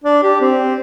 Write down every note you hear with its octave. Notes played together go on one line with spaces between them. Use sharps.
D4
G4
C4